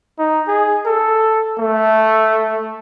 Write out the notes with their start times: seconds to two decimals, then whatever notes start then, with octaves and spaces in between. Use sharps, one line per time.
0.19 D#4
0.48 G#4
0.86 A4
1.59 A3